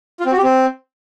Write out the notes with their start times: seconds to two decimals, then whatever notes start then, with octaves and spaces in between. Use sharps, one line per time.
0.20 F4
0.26 C4
0.32 F#4
0.37 G4
0.43 C4